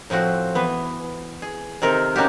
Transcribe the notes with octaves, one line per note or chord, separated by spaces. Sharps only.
A2 F3 C4 F#4
E3 B3
G#4
C3 D#3 C4 A4 A#4
A#3 C#4 D#4 F#4 G4